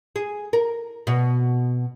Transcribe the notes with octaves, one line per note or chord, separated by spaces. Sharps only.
G#4
A#4
B2